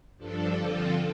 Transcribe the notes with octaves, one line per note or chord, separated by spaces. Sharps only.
G2 F3 D4 A4
D3 F3 C4 F4 A4